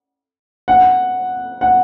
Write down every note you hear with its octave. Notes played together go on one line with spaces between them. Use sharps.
F#5
F#5